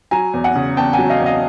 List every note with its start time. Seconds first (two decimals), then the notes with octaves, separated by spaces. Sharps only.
0.11 F#3 G#5 A#5
0.34 E2
0.44 F#5 G#5
0.55 C#3
0.77 E2 G5 A5
0.93 F#5 G#5
0.99 F#3
1.10 D#5 F5
1.21 E2
1.26 D#5 F5